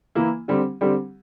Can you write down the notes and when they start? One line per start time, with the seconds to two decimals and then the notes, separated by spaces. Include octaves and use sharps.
0.15 E3 A#3 E4
0.48 D3 G3 C4 G4
0.81 D3 G3 C4 G4